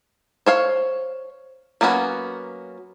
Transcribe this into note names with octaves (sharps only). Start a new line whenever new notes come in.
C5 C#5 F5
F#3 A#3 B3 C#4 F#4